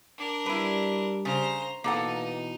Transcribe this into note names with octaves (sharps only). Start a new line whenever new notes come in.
D4 A#4
G3 E4 B4
C#3 C5 A#5
B2 E3 A#3 D#4 A4 F#5